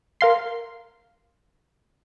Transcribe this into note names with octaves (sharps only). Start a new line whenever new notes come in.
A#4 F5 C6